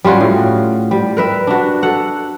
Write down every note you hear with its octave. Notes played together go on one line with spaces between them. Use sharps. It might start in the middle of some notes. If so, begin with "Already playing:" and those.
G3 C#4 F4 F#4
A2
G3
A#4 B4 E5
D4 F#4
A4 F#5